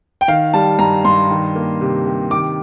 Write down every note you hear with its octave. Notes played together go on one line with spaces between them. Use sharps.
G5
D#3 F5
G3 A5
G2 A#5
G2 C6
D#3
A#3
C3
C3
D#3 D6